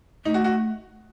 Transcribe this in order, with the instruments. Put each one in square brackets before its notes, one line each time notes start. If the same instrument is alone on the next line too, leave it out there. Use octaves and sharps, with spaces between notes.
[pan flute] A3 [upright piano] D#4
[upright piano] F#4
F#4